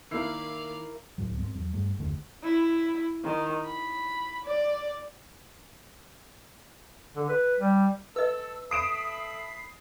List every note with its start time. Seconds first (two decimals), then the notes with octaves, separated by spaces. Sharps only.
0.11 D#3 A#3 E4 A#4 D5 F5 C7
1.18 D1 C#2 A2 F#3
1.39 G#2 C4
1.55 E2 F#3
1.74 G2 A3
1.98 F#1 D#2 D3 A3
2.43 E4
3.24 D#3
3.65 B5
4.46 D5
7.16 D3
7.29 B4
7.60 G3
8.16 A4 B4 D#5 E6
8.71 A4 E5 B5 D#6 C7 D7 E7